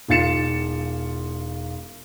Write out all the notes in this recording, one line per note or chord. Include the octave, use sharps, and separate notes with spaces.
E1 D#4 F4 A6 C#7 E7